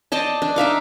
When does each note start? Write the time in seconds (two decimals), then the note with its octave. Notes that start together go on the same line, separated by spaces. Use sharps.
0.12 C5 D5 D#5 A5
0.42 D4
0.56 D#4 E5 F5 D6